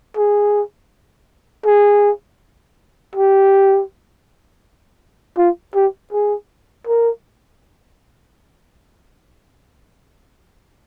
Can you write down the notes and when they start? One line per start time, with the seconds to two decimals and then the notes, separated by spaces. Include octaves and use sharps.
0.17 G#4
1.66 G#4
3.15 G4
5.38 F4
5.75 G4
6.12 G#4
6.87 A#4